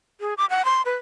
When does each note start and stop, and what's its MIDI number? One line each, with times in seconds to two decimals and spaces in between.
0.20 0.34 68
0.38 0.45 86
0.50 0.65 78
0.65 0.82 84
0.85 0.95 71